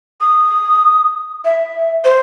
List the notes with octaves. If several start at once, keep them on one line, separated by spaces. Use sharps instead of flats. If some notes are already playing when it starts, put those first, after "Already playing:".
D#6
E5
C5